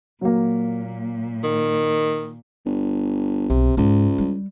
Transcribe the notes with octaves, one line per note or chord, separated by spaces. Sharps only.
A#2 F#3 A#3
D#3
G1
B1 C3
C#2 G#2
G3